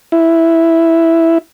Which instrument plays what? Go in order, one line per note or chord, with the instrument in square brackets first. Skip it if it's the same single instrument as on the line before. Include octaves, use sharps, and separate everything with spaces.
[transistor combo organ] E4